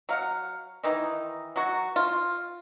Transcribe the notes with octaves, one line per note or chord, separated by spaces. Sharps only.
F#3 F5 F#5
D#3 E3 D#4
F#3 F#4
F4